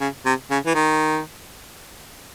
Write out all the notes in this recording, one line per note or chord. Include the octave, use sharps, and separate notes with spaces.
C#3
C3
C#3
E3
D#3